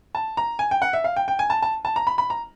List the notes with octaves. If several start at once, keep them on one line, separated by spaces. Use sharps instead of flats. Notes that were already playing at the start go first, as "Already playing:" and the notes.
A5
A#5
G#5
G5
F#5
E5
F5
G5
G5
G#5
A5
A5
A5
A#5
B5
B5
A#5